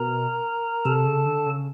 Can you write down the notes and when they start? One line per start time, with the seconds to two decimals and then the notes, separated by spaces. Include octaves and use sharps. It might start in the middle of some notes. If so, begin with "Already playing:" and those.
Already playing: B2 A#4 A#5
0.85 C3 A4 A5
1.05 C#3
1.26 D3
1.46 C#3